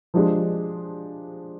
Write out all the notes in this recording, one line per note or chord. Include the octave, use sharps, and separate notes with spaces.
F3 G#3 D4 G4